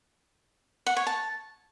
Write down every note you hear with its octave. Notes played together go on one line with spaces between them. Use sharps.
F#5
C#5
A5